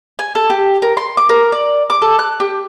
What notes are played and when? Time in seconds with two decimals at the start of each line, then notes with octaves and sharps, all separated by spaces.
0.19 G#5
0.35 A4
0.50 G4
0.82 A#4
0.97 C6
1.17 D6
1.29 A#4
1.52 D5
1.90 D6
2.02 A4
2.19 F#6
2.40 G4